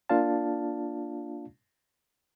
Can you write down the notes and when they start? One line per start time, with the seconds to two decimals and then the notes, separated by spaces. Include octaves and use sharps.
0.09 A#3 D4 F4 D5 F5 A5